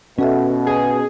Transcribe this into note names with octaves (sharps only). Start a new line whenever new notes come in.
B2 C#4 F#4 A4 E5
G#4